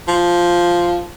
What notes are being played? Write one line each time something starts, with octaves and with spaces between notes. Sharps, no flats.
F3